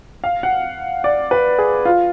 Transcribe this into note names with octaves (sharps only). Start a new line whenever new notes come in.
F5
F#5
D5
B4
G#4
F4